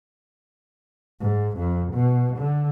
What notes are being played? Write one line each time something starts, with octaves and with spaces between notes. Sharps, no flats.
G#2
F2
B2
D3